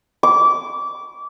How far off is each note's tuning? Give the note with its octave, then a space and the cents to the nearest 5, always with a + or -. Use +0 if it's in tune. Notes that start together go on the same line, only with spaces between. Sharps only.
D6 -25